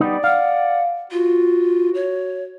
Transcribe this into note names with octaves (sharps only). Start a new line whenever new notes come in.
G3 B3 D#4 D5
F5 F#5
F4 F#4
C#5